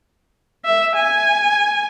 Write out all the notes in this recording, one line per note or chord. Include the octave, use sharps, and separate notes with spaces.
E5
G#5